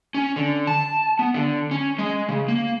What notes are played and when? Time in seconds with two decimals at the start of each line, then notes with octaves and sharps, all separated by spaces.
0.14 C#4
0.36 D3
0.67 A5
1.19 B3
1.34 D3
1.71 C#4
1.98 G#3
2.29 C#3
2.48 A#3